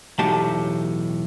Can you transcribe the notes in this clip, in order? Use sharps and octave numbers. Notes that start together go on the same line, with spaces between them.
B1 E2 A2 D#4 G4 A5